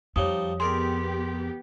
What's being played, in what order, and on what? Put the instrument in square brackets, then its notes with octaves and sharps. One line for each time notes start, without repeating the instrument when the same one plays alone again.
[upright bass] F2 [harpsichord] F3 G3 D#4 [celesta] C#5 D#6
[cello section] B3 G4 [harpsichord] G#4 A#4 D5 [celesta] C6